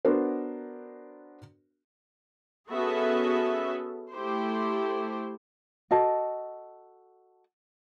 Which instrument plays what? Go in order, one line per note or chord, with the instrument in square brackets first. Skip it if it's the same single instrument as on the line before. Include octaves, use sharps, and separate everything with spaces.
[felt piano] B3 D4 F#4 A#4 C5
[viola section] B3 C#4 F#4 G#4 A4 E5
A3 E4 G4 C5
[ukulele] F#4 A4 D#5 A5